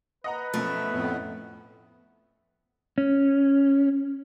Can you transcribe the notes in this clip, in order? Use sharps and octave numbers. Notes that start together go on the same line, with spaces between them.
B4 D#5 F#5 A#5
F#2 B2 F3 A3
F2 A2 B3
C#4